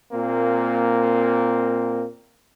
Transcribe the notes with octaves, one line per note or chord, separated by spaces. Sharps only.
A#2 A#3 C4